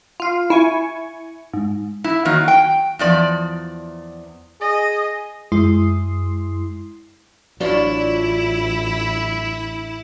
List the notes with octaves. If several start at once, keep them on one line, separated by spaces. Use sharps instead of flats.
F4 F5
E4 G#5 C#6
G#2
E4
D#3 F#3 A#3
G5
E2 F3 D5
G#4 D#5
F#2 G#3 E4 C6 D#6 C7
A1 F#3 D4 E4 F4 C#5